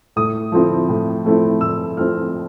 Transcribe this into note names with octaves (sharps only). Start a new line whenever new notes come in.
A2 D#6
F3 A3 C4 E4
A2
F3 A3 C4 E4
A2 E6
F3 A3 C4 E4 F6